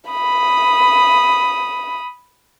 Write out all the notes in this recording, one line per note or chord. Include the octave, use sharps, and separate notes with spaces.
B5 D#6